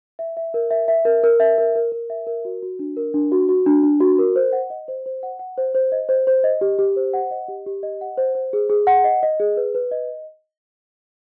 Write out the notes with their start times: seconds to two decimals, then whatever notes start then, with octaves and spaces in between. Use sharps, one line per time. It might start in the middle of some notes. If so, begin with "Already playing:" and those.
0.19 E5
0.37 E5
0.54 A#4
0.70 E5
0.88 E5
1.05 A#4
1.24 A#4
1.40 E5
1.58 A#4
1.76 A#4
1.92 A#4
2.10 E5
2.27 A#4
2.45 F#4
2.62 F#4
2.79 D4
2.97 A#4
3.14 D4
3.32 F#4
3.49 F#4
3.66 D4
3.83 D4
4.00 F#4
4.18 A#4
4.36 C5
4.52 F#5
4.70 D#5
4.88 C5
5.06 C5
5.23 F#5
5.39 F#5
5.58 C5
5.75 C5
5.92 D#5
6.09 C5
6.27 C5
6.44 D#5
6.61 G4
6.79 G4
6.97 C5
7.14 F#5
7.31 D#5
7.48 G4
7.66 G4
7.83 D#5
8.01 F#5
8.18 C5
8.35 C5
8.53 G#4
8.70 G#4
8.87 F#5
9.04 D#5
9.23 D#5
9.40 G#4
9.57 B4
9.74 B4
9.91 D#5